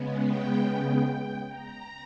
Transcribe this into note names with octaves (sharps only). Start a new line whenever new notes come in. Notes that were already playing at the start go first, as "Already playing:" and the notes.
Already playing: C#3 G#3 B3
G5
A#5